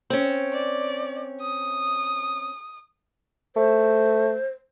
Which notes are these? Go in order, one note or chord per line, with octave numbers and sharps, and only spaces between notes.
C4 C#4
D5
D#6
A3 C5